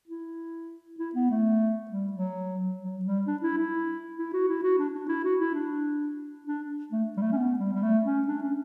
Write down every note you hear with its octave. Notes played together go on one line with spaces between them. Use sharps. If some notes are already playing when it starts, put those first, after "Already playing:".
E4
E4
B3
A3
G3
F#3
F#3
G3
D4
E4
E4
E4
F#4
E4
F#4
D4
D4
E4
F#4
E4
D4
D4
A3
G3
A3
C#4
B3
G3
G3
A3
C#4
D4
C#4